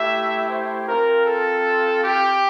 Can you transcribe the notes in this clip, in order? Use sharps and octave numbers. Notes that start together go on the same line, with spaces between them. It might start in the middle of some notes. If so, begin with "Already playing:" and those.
Already playing: A3 E4 G4 E5
C5
C4 F4 A#4
A4
G4